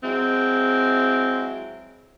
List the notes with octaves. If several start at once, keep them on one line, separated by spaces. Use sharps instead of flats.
F#3 G#3 C4 E4